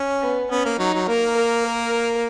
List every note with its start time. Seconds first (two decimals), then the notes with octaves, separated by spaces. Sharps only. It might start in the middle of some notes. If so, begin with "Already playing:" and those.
Already playing: C#4
0.21 B3
0.51 B3 C#4
0.65 A#3
0.79 F#3 D#4
0.94 F#3
1.08 A#3 A#4
1.36 A#4
1.65 A#4